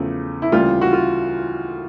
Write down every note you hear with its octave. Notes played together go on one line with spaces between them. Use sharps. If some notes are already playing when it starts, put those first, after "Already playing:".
Already playing: E2 C#3 F3 A3
E4
D2 C#3 E3 G3 A#3 F4
F#4
F4